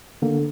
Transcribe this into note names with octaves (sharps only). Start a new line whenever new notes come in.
D3 A#3